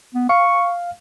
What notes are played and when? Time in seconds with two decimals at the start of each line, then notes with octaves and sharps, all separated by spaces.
0.15 B3
0.29 F5 C#6